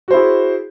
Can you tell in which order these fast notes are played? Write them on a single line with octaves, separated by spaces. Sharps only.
F#4 C5 E4 G#4